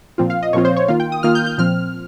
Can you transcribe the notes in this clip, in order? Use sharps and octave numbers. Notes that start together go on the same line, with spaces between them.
A#2 F3 C4 F4
F5
D#5
A#2 F3 C4 F4 C#5
C5
C#5
D#3 A#3 F4 F5
G5
D#6
D#3 A#3 F4 F6
G6
G6
A#2 F3 C4 F6